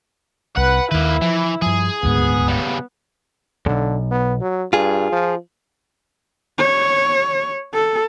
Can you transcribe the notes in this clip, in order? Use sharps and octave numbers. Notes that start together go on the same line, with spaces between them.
C2 B4 F#5
D#2 D#3 A#3 E4 B4
E3 F3
G2 F3 G#4
D#1 D2 G#2 B3
C#3 G3
B1 E2 D3
B3
F#3
G2 F4 G#4
F3
C#5
A4